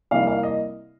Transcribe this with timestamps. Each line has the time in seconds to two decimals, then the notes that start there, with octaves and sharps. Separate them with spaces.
0.11 C2 C3 G3 A#3 F5
0.27 F5
0.43 D#5